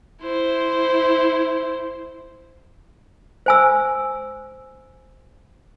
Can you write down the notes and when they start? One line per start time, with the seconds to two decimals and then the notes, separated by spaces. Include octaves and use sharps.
0.22 E4 C5
3.46 C5 G#5 E6